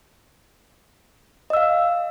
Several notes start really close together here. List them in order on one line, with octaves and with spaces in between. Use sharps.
D#5 E6 F5